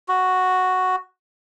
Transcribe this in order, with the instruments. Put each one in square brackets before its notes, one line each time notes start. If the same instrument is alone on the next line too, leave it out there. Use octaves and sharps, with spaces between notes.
[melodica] F#4